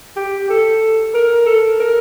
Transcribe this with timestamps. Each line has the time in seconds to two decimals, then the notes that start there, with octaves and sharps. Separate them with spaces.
0.16 G4
0.49 A4
1.14 A#4
1.46 A4
1.79 A#4